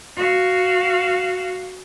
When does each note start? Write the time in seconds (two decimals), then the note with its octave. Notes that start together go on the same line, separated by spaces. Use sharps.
0.16 F#4 F5